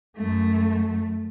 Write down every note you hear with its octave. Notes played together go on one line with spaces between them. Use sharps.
F#2 A3